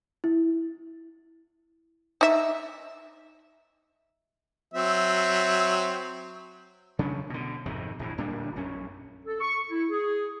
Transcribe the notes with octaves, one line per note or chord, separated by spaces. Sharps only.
E4
D#4 E5
F#3 C4 E5
C#3 F#3 C#4 D4
B2 D3
G#1 F2 C3 D#3
A#1 A2 E3
D1 A#2 G3 D4
A#1 F#2 C#4
A4
C#6
E4
G#4